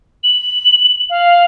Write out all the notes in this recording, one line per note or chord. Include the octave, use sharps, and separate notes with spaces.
F#7
F5